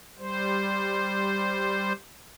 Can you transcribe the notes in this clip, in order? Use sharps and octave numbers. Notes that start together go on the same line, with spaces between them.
G3 C5